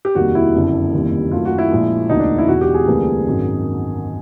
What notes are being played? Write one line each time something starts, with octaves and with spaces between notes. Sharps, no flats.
G4
F1 D#2 D#3 G3 F#4
E4
F#1 F2 D3
F1 D#2 D#3 G3
F#2 D#3 F#3 A3 F4
F#4
E4
A#1 A#2 F3 G#3
E1 D2 D3 F#3 A#3 D#4
D4
E4
E1 E2 B2 F#4
G4
G#4
D2 C3 E3 G3 A#3
G#1 F#2 D#3 F#3